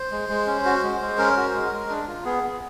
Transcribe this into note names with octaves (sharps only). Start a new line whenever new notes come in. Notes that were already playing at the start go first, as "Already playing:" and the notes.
Already playing: C5
G#3
G#3
C#4
F#4
G#3
G#3
C#4 A#4
F#4
G#3
G#3
D4
F4
B3 G#4
B3